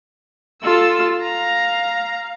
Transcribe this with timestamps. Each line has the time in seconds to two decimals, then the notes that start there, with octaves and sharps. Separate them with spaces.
0.63 F4 A4 E6
1.22 F5 A#5